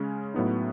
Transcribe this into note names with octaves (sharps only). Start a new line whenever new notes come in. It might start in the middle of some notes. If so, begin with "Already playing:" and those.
Already playing: C#3 G#3 C#4
A2 F#3 B3 D#4